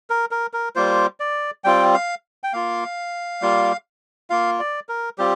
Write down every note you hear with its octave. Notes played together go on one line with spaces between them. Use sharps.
A#4
A#4
A#4
G3 A#3 F4 C5
D5
G3 C4 F4 G5
F5
G5
A#3 F4 F5
G3 A#3 F4
A#3 F4 F5
D5
A#4
G3 C4 F4 G4